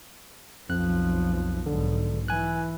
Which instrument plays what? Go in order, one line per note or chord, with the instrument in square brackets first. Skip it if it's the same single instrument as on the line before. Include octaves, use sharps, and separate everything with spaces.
[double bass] B1 F3 [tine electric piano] F2 F#6
[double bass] B1 G#2 [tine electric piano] D3
[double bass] E3 [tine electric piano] G#5 F#6